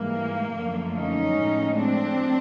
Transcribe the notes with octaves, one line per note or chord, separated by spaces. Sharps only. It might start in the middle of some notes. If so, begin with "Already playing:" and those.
Already playing: G#2 E3 G3 A#3
F#2 D3 F3 A3
C#4 D#4
A2 F3 G#3
C4 D4